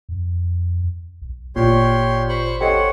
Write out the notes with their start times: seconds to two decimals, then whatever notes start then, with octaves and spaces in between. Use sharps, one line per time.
0.09 F2
1.22 B1
1.56 G#1 A#2 G4 C#5 C6
2.29 C5 B5 C#6
2.61 G4 A4 C5 C#5 D#5 F#5